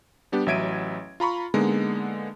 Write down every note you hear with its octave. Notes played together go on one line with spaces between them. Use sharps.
G3 B3 D4 G4
A1 F#3 E5 G#6 D7 D#7
F4 A#5 B5 C#6
D3 G#3 A#3 B3 D#4